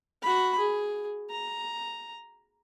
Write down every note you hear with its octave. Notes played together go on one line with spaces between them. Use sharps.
F#4 B5
G#4
A#5